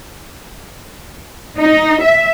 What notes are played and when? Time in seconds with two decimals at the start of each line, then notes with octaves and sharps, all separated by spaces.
1.58 D#4
2.02 E5